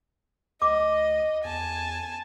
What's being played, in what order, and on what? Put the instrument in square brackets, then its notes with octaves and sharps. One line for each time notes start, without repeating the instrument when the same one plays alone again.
[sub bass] D2 [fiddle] D#5 [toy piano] D6
[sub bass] E2 [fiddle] G#5 A5